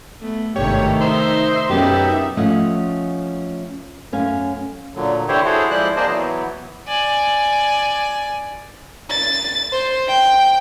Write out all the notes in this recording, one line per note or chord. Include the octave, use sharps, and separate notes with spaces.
A3 B3
G#1 G2 C3 D#3 A3 G4 C#5
D#4 C5 E5
B1 F#2 B3 G4
F3 A3 C#4 D#5 F#5 G#5
F#2 A3 C#4 F5 G#5
A#2 D3 F#3
D3 E3 E4 G4 C5 C#5
E4 F#4 G#4 A4 C5 C#5
F3 G#3 E4 C5 D5 F#6
A#3 G#4 C5 D5 D#5 A5
E3 F#3 B3
D5 G#5
A6
C5
G5